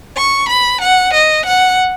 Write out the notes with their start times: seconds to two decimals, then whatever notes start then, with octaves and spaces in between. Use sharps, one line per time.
0.17 C#6
0.49 B5
0.81 F#5
1.14 D#5
1.46 F#5